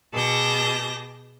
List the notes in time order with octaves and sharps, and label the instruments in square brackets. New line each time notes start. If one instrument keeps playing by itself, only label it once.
[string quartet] B2 G#4 A5 D6 G6 A#6